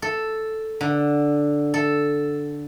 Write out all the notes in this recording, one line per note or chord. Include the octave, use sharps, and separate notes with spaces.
A4
D3
A4